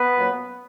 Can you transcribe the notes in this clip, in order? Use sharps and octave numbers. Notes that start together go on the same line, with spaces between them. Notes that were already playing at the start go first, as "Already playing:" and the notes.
Already playing: B3 B4
A#2 F#3 A#3 C#4